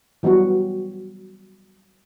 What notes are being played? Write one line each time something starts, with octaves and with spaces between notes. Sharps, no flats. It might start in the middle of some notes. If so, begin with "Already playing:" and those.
E3 F#3 G3 B3 F#4